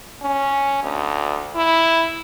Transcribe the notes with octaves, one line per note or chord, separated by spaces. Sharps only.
C#4
D2
E4